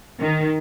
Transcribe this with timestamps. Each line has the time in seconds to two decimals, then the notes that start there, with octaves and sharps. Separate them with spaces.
0.20 D#3